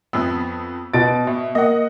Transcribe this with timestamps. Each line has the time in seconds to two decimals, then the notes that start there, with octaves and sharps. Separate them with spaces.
0.13 F2 B3 E6
0.94 B2 A6 D7
1.27 B2 E5
1.55 A#3 D#5 F#5